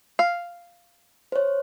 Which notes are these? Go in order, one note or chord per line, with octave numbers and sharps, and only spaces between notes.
F5
C5 C#5